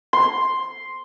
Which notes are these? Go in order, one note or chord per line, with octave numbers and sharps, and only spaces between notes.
C6